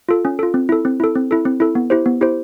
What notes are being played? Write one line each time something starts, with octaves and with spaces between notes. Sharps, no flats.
F4 A4
C#4
F4 A4
C4
E4 A4
C4
E4 A4
C4
E4 A4
C4
E4 A4
B3
E4 G4 C5
B3
E4 G4 C5